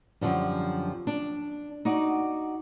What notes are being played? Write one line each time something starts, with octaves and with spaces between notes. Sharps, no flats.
F#2 D3 F3 G3
D4
D#4 F#4 D5